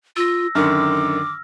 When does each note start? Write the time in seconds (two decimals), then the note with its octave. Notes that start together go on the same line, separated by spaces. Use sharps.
0.17 F4 E6 A#6
0.55 F#2 D3 D#3 D6 F6